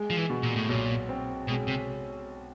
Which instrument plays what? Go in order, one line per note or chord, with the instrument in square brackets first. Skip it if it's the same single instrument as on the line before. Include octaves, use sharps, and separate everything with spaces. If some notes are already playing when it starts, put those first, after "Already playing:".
Already playing: [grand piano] G#3
[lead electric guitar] F3
E3
[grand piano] B2
[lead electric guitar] A#2
A2
[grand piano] B1 [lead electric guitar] A#2
[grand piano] C4
[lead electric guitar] B2 [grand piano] G#3
[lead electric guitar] C3